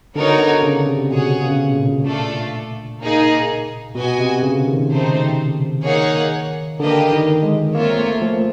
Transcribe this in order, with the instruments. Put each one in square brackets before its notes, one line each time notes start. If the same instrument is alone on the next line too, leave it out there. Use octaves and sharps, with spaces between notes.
[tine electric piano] D3 [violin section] B3 D#4 F#4 A#4 C#5
[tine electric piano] D3
C#3
C3
[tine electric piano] B2 [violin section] G#4 C#5 F#5
[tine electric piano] C#3
A#2
[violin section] A3 D4 F4 A4 D5
A#3 D#4 G#4
[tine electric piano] B2 [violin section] F#4 B4 D#5 G#5
[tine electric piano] C3
C#3
D#3
[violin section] A3 C4 D#4 G4 C5
A#3 D#4 G#4 C#5 F#5
[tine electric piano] D3 [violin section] A#3 D4 G4 B4 D#5
[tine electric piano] D#3
G#3
[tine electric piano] A#3 [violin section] C4 F4 A#4 C#5 E5
[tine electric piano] A3
F3